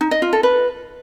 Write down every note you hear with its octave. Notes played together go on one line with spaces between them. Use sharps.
D#4
D#5
F4
A4
B4